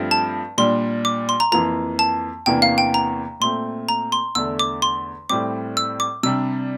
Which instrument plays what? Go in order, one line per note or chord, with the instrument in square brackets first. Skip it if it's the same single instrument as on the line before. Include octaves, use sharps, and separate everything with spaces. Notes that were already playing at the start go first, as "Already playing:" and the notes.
Already playing: [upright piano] G2 F3 A3 C4
[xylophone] A5
[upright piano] A#2 G3 D4 [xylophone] C6
[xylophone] D6
C6
A#5
[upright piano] F2 E3 A#3 [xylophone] A#5
[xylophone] A5
[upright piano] E2 C3 E3 A#3 D4 [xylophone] G5
[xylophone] F5
G5
A#5
[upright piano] A#2 A3 C4 [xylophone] C6
[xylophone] A#5
C6
[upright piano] E2 D3 A3 D4 [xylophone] E6
[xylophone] D6
C6
[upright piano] A2 G3 C4 [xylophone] D6
[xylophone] E6
D6
[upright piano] C3 G3 D4 [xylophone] E6